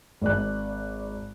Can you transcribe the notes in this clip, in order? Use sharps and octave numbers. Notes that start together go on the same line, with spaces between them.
G#1 D5 F#6